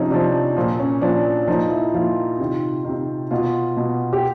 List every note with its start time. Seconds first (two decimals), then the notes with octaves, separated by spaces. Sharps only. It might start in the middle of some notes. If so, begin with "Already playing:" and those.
Already playing: C3 F3 C#4 D#4
0.10 C3 F3 D4
0.57 A#2 F3
0.79 C#4
1.02 A#2 F3 D4
1.47 A#2 F3 D#4
1.70 E4
1.94 A#2 F3 F4
2.39 C3 D#3
2.85 C3 D#3
3.31 B2 F4
3.77 B2
4.13 G4